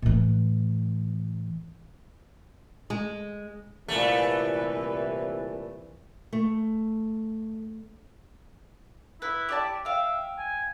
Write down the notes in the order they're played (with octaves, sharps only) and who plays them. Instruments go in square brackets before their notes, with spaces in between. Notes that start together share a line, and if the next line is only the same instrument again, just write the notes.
[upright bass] A2 E3
[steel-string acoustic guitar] G#3
[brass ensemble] C2 E3 [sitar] A#2 A3
[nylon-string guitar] A3
[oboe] E4 [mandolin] B4
[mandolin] G4 D5 A5
[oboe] E5 [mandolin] F5 G5
[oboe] G#5